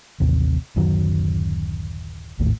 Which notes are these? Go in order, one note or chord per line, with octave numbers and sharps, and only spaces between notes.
A1 D#2 C3
D1 F#2 D#3 F#3
G#1 D#2 A2